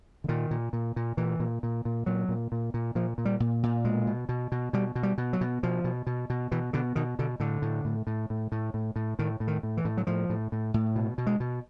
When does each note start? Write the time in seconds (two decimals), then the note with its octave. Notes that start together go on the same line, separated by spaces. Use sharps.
0.24 D3
0.28 A#2 D#3
0.51 A#2
0.73 A#2
0.96 A#2
1.17 A#2 E3
1.40 A#2
1.63 A#2
1.85 A#2
2.06 A#2 F#3
2.29 A#2
2.52 A#2
2.74 A#2
2.95 A#2 F3
3.18 A#2
3.25 G3
3.40 A#2
3.63 A#2
3.85 B2 G#3
4.07 B2
4.29 B2
4.52 B2
4.73 B2 G3
4.95 B2
5.03 G3
5.18 B2
5.33 F#3
5.41 B2
5.63 B2 F3
5.84 B2
6.07 B2
6.30 B2
6.51 B2 E3
6.73 B2 D3
6.95 B2 D#3
7.19 B2 D3
7.40 A2 D3
7.62 A2
7.85 A2
8.07 A2
8.30 A2
8.52 A2
8.74 A2
8.96 A2
9.19 A2 D#3
9.40 A2
9.48 D#3
9.63 A2
9.77 E3
9.85 A2
9.97 F#3
10.07 A2 F3
10.30 A2
10.52 A2
10.74 A2
10.96 B2
11.18 B2
11.27 G#3
11.40 B2